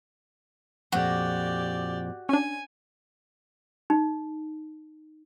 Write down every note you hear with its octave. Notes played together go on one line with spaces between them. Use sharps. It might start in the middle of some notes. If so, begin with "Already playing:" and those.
F2 A#2 F#4 G4 D5
C#4 D4 G#5
D#4